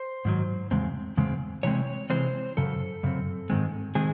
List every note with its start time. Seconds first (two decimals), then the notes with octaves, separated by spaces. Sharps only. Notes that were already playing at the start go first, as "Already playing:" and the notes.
Already playing: C5
0.25 G#2 D#3 F#3
0.71 E2 C#3 G#3 C4
1.17 E2 C#3 G#3 C4
1.63 C3 E3 G#3 C4 C#5
2.10 C3 E3 G#3 C4 C5
2.57 F#2 C#3 A4
3.03 F#2 C#3 C4
3.50 G#2 D#3 G#3 C4
3.95 D#3 G#3 C4 G#4